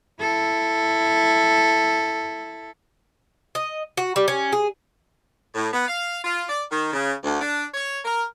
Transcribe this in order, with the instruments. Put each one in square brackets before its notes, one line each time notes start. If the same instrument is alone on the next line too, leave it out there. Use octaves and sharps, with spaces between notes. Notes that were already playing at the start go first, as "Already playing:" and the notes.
[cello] E4 A4
[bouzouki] D#5
F#4
G3
C#4
G#4
[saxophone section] A2
B3
F5
F4
D5
D#3
C#3
D2
D4
C#5
A#4